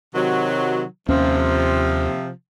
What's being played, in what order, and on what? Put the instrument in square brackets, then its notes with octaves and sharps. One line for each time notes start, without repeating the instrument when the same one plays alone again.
[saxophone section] C3 D#3 F#3
[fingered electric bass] D#2 C#4 [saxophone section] C3 F3